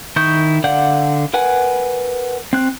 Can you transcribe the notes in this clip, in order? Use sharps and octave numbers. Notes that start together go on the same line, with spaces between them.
D#3 E4 C#6 D#6 G6
D3 D5 F5 F#5 G6
A#4 B4 F#5 G#5
C4 F#6